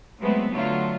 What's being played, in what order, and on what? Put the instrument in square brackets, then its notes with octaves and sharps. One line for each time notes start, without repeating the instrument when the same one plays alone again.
[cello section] F#3 G#3 A3 B3 C4
D3 F#3 A3 F4